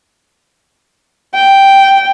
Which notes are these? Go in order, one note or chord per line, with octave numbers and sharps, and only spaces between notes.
G5